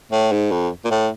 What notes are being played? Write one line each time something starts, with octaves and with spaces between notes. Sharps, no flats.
A2
G#2
F2
A#2
A2